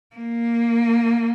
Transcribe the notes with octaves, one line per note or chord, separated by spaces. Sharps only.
A#3